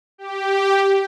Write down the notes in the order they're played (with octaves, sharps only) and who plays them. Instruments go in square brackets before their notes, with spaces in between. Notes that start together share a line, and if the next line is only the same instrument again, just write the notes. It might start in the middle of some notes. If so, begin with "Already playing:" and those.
[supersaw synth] G4